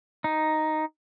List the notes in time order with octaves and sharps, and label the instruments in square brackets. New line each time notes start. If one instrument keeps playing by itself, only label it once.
[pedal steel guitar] D#4